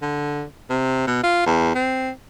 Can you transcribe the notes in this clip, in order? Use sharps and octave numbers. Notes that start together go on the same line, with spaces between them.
D3
C3
B2
F4
E2
C4